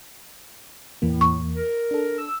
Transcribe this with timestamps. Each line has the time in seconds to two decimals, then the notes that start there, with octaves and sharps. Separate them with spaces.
1.02 E2 A2 E3 A#3
1.21 C#6
1.56 A#4
1.91 D4 A4
2.18 E6